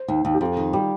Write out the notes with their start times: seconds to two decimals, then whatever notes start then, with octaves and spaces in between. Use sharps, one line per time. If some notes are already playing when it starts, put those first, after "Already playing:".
Already playing: C5
0.08 D#2
0.25 D#2
0.34 G4
0.41 F2 F4
0.57 D#3
0.73 G3 G4